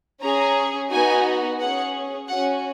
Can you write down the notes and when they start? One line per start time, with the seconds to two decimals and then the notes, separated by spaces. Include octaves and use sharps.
0.22 C#4 G#4 A#5
0.91 B3 D#4 F#4 G#5
1.59 C#4 G#4 F#5
2.28 C#4 F#4 F#5